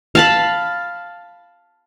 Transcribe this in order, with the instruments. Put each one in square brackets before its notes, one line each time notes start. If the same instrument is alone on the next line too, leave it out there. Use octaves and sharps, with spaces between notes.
[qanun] F5 A5 B5